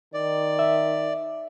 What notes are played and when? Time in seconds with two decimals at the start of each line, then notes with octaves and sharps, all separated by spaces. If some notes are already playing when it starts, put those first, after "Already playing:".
0.14 D#3 D5
0.59 E5